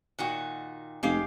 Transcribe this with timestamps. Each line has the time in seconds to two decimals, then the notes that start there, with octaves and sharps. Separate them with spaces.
0.19 A#2 D#3 F#4
1.03 F1 G#3 G4 F5